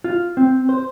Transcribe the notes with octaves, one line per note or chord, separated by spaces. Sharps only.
F4
C4
C5